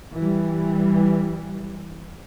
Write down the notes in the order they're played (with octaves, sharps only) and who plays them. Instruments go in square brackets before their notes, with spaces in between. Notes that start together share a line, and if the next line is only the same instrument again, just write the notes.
[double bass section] E3 G3